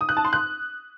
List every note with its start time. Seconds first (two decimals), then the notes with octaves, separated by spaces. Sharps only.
0.01 D#6
0.09 F#6
0.17 A5
0.25 C6
0.33 F#6